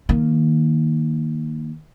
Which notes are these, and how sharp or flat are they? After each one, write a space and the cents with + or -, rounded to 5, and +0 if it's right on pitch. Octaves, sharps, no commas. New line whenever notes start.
D#3 +0 A#3 +0